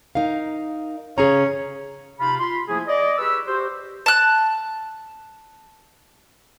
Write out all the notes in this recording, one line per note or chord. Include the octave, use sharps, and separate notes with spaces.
D#4 A#4 F5
C#3 C#4 G#4 A#5
C3 D#4 F4 B5
F4 B5 C6
F3 A3 A#3 E4 G#4
D5 D#5
G4 G#4 B4 B5 C#6 E6
F#4 G4 C5
A5 F#6